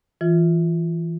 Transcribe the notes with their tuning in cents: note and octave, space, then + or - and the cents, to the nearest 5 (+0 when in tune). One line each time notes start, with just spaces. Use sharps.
E3 +0 F4 +0